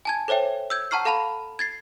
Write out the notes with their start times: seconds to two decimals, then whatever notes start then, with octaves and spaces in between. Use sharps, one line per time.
0.05 G#5 A5 G#6
0.28 A4 C5 C#5 E5 G5
0.70 E6 G6 G#6
0.91 F#5 A5 A#5 C#6 F6 C7
1.05 A4 F5 A5 B5 F7
1.59 G#6 A6 C7